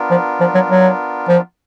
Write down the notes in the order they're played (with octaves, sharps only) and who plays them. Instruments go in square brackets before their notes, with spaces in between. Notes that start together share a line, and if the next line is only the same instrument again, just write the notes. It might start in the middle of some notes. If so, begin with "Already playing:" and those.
Already playing: [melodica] B3 D4 F4 A#4
[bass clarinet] F3
F3
F#3
F#3
F3